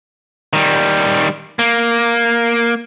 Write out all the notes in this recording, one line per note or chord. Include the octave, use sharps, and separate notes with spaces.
D#3 G3
A#3